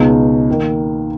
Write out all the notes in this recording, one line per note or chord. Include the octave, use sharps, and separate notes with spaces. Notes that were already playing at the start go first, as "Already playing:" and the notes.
Already playing: C#2 B2 G#3 D#4
D#3 A#3